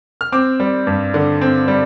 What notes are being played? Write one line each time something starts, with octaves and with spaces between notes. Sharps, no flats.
F6
C4 D6
G3
G2
D3
C4
G3